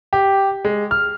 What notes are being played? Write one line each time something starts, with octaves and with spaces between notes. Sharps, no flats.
G4
G#3
F6